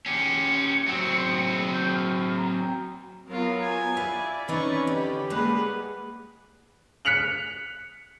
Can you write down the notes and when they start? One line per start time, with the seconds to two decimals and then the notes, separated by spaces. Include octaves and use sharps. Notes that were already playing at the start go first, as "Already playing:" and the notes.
0.06 C#4 G4 C#7
0.88 F#3 C4
1.73 G6
1.94 F6
2.37 A#5
3.29 F#3 B3 F4 A#4
3.63 G#5
3.97 E4 B4 D5 F5
4.48 E3 C4 C#4 D#4 B4 C#6
4.87 D3 D#4 G4 B5
5.30 G3 G#3 A#3 G#4 B4 F#5
7.05 F#6 B6 C#7 F7 F#7